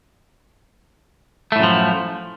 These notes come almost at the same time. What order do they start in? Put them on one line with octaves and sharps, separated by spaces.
A3 A2 F#2 F3